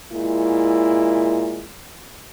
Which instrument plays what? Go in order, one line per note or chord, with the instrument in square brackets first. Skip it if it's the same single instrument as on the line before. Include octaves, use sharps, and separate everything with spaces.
[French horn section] A#2 G#3 E4